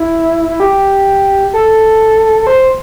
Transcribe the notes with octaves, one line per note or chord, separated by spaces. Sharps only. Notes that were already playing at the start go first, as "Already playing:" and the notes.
Already playing: E4
E4
G4
A4
A4
C5